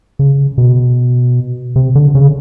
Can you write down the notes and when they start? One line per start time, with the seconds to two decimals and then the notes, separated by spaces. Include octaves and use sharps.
0.19 C#3
0.58 B2
1.76 C3
1.95 D3
2.15 C#3